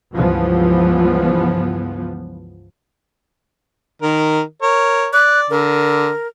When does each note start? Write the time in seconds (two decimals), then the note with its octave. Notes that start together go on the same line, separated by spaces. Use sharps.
0.13 C#2 G2 E3 F3 B3
4.02 D#3 A#4
4.62 A#4 C#5
5.13 D5 F#6
5.50 D3 A#4